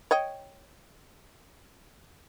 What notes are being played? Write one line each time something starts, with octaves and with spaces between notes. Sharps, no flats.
C#5 D#5 G5